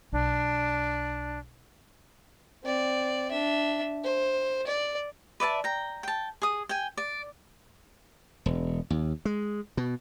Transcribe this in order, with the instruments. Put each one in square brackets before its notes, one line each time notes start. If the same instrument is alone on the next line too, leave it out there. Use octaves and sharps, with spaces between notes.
[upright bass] B1 [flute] D4
[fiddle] C4 D5
D4 E5
C5
D5
[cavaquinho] B4 D5 E5 A5
G5 A#5
G5 A5
G#4 D#6
G5 G#5
D5
[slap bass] E1
D#2
G#3
B2